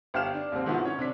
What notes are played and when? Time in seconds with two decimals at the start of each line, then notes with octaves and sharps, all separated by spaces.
0.14 G1 G4 F5 F6 E7
0.34 D4
0.52 D#2 G#2 C3 C4
0.66 G#2 D#3 F3 B3 E4 F#4
0.85 C#4 C#5
0.99 C3 D4 B6